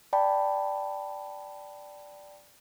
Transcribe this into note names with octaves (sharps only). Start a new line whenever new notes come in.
D5 G5 A5 B5